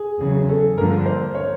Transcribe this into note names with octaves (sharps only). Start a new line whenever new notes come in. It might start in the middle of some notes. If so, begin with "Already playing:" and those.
Already playing: G#4
E2 C#3 F#3 G#4
A4
G2 D3 F3 A#3 A#4
C5
C#5